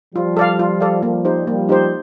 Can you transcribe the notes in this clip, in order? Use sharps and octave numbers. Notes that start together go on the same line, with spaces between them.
F3 G3 F4
A4 D5 F5
F4
A4 D5 F5
F3 G3 A#3
D#4 G4 C5
F3 G3 A#3
D#4 G4 C5